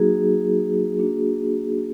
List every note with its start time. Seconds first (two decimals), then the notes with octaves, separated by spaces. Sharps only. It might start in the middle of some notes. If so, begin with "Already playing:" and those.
Already playing: F#3 A#3 D#4 F#4 G#4
0.99 A#3 D4 F#4